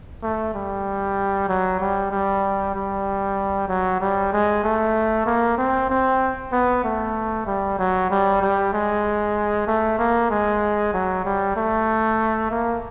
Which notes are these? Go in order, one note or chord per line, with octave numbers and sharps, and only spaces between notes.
A3
G3
F#3
G3
G3
G3
F#3
G3
G#3
A3
A#3
C4
C4
B3
A3
G3
F#3
G3
G3
G#3
A3
A#3
G#3
F#3
G3
A3
A#3